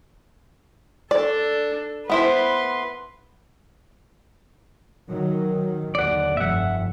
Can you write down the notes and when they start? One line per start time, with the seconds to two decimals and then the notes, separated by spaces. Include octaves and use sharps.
1.11 D4 A4 D5
2.10 B3 E4 B4 C5 C6
5.09 D#3 F#3
5.95 D#2 D3 D5 F#5
6.37 F1 G2 E5 F#5